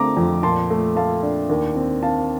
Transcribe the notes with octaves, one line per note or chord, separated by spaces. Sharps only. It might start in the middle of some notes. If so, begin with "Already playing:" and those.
Already playing: D3 A3 C4 A#5 D6
F2
A#2 A5 C6
A3
A3 F5 A5
D4
D#2
C4
C4 F5 A5